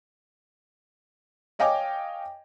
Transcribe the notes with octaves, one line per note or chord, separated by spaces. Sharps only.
C#5 D#5 F5 G5 G#5 D6